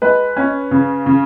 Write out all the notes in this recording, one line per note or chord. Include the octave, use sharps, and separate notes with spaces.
G#3 B4
C#4
C#3
C#3